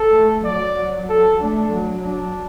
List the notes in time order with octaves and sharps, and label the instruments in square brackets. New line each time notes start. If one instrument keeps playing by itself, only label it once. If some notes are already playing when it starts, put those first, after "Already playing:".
Already playing: [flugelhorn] A4
[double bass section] A3
[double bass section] F#3 [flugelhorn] D5
[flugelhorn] A4
[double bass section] A3 [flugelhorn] D4
[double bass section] F#3
[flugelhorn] D4